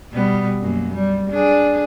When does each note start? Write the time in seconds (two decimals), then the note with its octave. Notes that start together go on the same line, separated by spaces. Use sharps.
0.12 B2 G3 B3
0.60 F#2 A#3
0.91 G3
1.30 D4 G#4